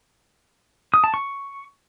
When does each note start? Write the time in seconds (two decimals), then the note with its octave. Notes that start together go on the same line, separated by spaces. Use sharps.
0.94 D#6
1.04 A5
1.14 C#6